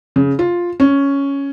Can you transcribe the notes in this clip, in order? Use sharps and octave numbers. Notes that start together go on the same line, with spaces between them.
C#3
F4
C#4